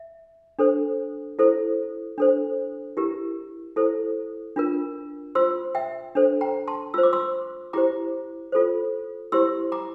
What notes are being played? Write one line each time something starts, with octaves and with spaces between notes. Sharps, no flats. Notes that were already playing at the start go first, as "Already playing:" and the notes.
Already playing: E5
D4 A4 C5
E4 A4 C5
D4 A4 C5
E4 G4 A#4
E4 A4 C5
D4 F4 A#4
F4 C5 C6 E6
E5 G5
D4 A4 C5
G5 A#5
A5 C6
F4 C5 E6
D6
C6 E6
E4 G4 C5 A#5 D6
F4 A4 C5
E4 G4 C5 C6 E6
A#5 D6